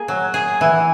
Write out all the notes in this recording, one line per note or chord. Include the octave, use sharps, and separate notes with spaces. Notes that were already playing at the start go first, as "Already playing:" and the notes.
Already playing: A#3 G#4
F#3
G#4
E3